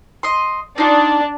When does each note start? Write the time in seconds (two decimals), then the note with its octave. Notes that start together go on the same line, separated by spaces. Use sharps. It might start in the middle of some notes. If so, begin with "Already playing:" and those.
0.23 D#5 C6
0.78 D4 D#4 F4